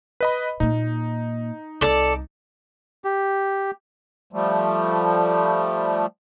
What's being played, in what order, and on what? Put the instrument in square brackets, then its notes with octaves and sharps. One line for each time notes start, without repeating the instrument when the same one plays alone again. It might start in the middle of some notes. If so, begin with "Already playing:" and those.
[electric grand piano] B4 D#5 B5
[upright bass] A#2 A#3 [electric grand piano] D#4
[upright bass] C2 [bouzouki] A4 D5
[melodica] G4
[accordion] F3 G3 A3